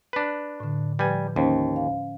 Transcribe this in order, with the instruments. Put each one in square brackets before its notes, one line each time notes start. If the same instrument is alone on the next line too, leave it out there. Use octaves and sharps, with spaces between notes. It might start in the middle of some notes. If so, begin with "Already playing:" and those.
[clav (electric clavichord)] D4 B4
[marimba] A2 D3
[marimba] F3 B4 [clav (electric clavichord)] G3 G#5
[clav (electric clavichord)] D#2 [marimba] C#4 C5
[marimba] F5